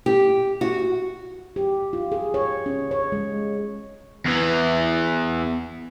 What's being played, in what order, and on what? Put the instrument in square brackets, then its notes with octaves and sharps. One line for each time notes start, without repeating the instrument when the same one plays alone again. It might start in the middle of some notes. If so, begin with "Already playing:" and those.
[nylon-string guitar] G4
F#4
[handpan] G4
F4
G#4
C#5
C#4
C#5
G#3
[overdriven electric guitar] E2 E3